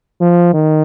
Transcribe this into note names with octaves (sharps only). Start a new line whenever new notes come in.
F3
D#3